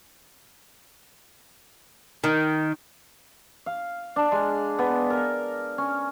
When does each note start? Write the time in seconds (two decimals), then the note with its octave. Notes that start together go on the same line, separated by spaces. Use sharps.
2.24 D#3
3.66 F5
4.16 D4
4.32 G#3
4.79 B3
5.10 A#4
5.78 C#4